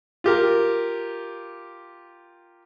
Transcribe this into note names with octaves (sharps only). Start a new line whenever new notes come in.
F4 G4 A#4